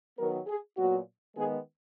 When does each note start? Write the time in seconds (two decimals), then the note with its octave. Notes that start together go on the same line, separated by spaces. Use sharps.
0.18 D#3 F#3 B3 A#4
0.47 G#4
0.77 A#2 F#3 B3 F#4
1.36 D#3 G#3 B3 G#4